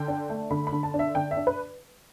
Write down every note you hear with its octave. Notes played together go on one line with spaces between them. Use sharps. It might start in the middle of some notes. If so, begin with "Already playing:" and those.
Already playing: D3 G5
D4
A3
D3 B5
B5
D3
A5
D4
E5
D3 G5
E5
D4
B4